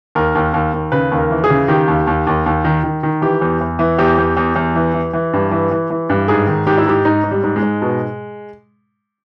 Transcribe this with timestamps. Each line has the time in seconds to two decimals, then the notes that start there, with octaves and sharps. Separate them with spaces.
0.15 D#2 A#4
0.35 D#2
0.54 D#2
0.73 D#2
0.92 C#3 B4
1.11 D#2
1.18 A#4
1.30 E3
1.44 G#4
1.50 C#3
1.68 D#3 G4
1.88 D#2
2.07 D#2
2.27 D#2
2.46 D#2
2.64 D#3
2.84 D#3
3.03 D#3
3.22 E3 G4
3.41 E2
3.61 E2
3.79 E3
3.98 E2 G4
4.18 E2
4.37 E2
4.56 E2
4.75 E3
4.94 E3
5.13 E3
5.33 G2
5.51 E3
5.71 E3
5.90 E3
6.09 G2
6.28 G#2 G#4
6.47 D#3
6.67 G#2 G4
6.78 E4
6.86 G#2 G4
7.05 G#2 D#4
7.24 G#2
7.31 G3
7.44 G#2
7.56 G#3
7.62 G#2
7.82 B2